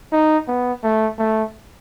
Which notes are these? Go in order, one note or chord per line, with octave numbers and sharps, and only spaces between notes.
D#4
B3
A3
A3